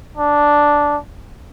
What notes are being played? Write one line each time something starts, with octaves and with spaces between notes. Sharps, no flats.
D4